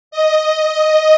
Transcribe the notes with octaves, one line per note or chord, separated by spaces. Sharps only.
D#5